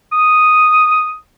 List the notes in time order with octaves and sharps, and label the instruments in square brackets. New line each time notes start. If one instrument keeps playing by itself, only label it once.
[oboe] D#6